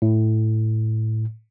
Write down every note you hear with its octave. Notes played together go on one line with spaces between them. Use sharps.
A2